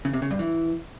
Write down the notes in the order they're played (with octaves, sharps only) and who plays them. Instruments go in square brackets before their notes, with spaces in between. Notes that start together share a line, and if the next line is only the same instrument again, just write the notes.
[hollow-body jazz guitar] C#3
C3
C#3
G2
E3